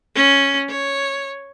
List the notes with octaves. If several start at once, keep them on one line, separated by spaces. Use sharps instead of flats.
C#4
C#5